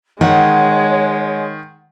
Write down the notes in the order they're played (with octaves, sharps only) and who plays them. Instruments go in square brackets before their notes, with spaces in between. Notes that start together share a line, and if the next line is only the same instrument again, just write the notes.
[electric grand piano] D#3 [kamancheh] G#3 [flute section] C#5 [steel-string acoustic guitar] F#5